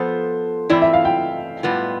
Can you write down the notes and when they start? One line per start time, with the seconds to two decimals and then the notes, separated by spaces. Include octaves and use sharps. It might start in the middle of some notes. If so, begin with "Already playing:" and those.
Already playing: F3 B3 F4 A4 C5
0.70 E3 A3 C4 E4 D5
0.82 E5
0.93 F5
1.05 G5
1.63 A2 G3 B3 F4